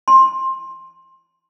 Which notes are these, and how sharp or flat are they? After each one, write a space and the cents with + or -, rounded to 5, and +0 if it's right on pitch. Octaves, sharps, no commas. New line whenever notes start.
C6 +15